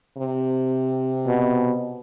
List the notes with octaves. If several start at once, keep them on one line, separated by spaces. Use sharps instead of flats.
C3
B2